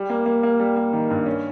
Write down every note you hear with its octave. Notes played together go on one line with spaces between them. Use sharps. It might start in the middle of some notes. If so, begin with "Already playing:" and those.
Already playing: G3
A#3
A#3
A#3
G3
A#3
D#3
G2
C#4